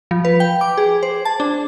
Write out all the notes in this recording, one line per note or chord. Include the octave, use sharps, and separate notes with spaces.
F3
B4
G5
D6
G#4
C5
A5
D4